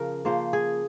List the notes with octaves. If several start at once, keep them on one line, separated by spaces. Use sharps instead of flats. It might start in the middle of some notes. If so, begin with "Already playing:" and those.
Already playing: C#3 F3 A#4
C#3 F3 A#3 C5
G#4